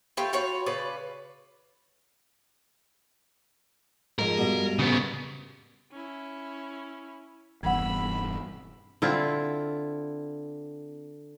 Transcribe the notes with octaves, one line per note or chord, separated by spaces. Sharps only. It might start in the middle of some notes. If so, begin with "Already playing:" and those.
A3 E4 F4 G4
F4 F#4 B4 C#5
C#3 B4 D5
F2 G#2 A#4
G2 B2
C#3 B3
C#4 E4
E1 E2 G2 F#5 B5 E6 G#6
D3 C4 E4 F4